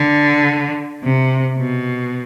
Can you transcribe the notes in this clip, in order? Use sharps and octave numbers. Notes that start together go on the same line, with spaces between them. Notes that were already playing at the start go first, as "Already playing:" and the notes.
Already playing: D3
C3
B2